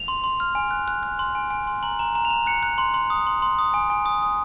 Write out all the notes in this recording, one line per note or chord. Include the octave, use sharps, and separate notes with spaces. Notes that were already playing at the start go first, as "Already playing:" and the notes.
Already playing: F7
C6
C6
F6
G#5
F#6
F#6
F#6
C6
G#5
G#5
C6
A#5 F#7
A#5
A#5
F7
A#5
F#6 C#7
F#6
C6
C6
D#6
C6
C6
D#6
G#5
G#5
D#6
D#6